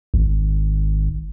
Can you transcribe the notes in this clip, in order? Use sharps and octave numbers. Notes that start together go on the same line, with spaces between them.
G#1